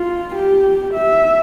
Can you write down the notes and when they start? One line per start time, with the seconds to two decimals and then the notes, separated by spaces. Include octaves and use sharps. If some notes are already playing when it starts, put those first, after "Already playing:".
Already playing: F4
0.36 G4
0.94 E5